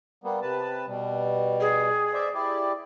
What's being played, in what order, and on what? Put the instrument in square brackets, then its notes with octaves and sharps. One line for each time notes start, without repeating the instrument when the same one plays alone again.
[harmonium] G3 A#3 B3
C3 B4 A5
B2 G3
[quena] G#4
[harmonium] C5 D5 E5
E4 G4 D5